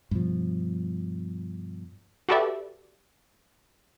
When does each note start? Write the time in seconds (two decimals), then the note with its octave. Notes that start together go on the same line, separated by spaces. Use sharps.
0.11 G2 B2 F3
2.29 F#4 G4 A4 B4 D5 E5